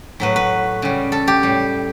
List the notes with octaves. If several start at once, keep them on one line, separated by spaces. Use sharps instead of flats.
A2 F#3 B4
B4
C#3 G3
A4
G4
A2 G3